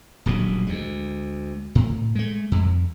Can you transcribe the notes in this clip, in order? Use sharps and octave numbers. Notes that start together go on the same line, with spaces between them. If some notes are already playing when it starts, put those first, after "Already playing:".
D#1 A#1 B2 F#3
D2 G#3
A2
G#3 A3
F2